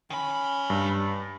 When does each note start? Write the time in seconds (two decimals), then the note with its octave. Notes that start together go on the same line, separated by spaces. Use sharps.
0.10 D#3 C#4 B5
0.70 G2